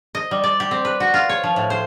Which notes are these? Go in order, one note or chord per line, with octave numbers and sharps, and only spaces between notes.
D#5
G3
D5
G4
C4
B4
F#4
F4
C#5
F3
A2
C5